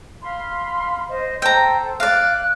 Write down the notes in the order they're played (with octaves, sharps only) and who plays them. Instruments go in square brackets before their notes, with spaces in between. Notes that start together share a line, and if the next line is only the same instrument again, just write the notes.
[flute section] F5 B5 C6
C5 D#5
[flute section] A4 C5 [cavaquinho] G5 A#5
[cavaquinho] D5 F5 [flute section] F#6